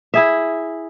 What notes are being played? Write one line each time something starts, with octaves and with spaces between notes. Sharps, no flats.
E4 G#4 E5